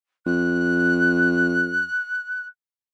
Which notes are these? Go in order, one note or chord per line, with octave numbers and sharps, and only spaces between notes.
F2 F#6